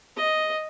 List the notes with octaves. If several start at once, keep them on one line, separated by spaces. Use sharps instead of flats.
D#5